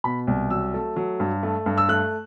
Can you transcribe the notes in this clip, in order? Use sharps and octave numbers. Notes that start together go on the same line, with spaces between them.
B2 B5
C2
F#3 E6
A3
F#3
G2
A3
G2
E6
A3 F#6